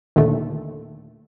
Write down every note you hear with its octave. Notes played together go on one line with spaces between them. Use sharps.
D#2 A#2 D3 D#3 A3